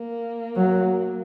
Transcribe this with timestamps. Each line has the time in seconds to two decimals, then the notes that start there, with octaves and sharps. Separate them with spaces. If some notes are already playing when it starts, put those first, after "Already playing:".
Already playing: A#3
0.56 F#3